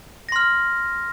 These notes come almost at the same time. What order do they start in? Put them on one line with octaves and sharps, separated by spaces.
A#6 C6 F6